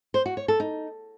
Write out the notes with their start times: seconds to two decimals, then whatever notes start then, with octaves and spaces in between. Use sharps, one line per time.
0.14 C5
0.26 F#4
0.37 C#5
0.48 A4
0.60 D#4